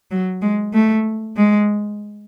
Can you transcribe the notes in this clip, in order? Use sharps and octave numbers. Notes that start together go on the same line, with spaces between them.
F#3
G#3
A3
G#3